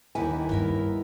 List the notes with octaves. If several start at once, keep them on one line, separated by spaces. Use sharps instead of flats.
D#2 E3 E4 F#5 G#5
G2 B3 E4 A#4